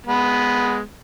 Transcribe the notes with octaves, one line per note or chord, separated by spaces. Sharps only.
G#3 B3